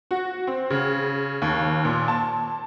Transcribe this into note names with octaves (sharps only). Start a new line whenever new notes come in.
F#4
C4
C#3
D#2
A#2
A5